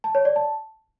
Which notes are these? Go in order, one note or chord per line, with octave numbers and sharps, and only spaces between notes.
A5
C#5
D5
A5